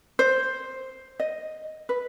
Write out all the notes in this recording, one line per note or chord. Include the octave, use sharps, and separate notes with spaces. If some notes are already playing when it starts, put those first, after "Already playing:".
C5
D#5
B4